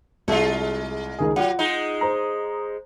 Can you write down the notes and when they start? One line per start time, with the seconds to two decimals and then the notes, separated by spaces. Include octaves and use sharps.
0.28 C2 G#3 F4
1.19 C#2 D#3 G#4
1.36 F#3 F4 F#5
1.59 G#3 D#4
2.01 C5 A#5